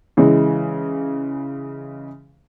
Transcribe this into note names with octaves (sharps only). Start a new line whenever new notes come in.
C#3 E3 G#3